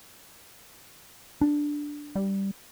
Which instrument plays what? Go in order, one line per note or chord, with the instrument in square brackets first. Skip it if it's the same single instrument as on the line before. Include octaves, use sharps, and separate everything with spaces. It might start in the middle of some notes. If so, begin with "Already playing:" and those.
[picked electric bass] D4
[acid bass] G3